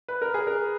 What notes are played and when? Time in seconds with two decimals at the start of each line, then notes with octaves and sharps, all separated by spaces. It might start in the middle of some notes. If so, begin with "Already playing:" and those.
0.08 B4
0.22 A#4
0.34 G#4
0.47 A#4